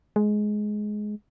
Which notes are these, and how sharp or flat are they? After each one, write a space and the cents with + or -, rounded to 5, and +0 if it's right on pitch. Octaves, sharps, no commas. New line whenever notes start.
G#3 +15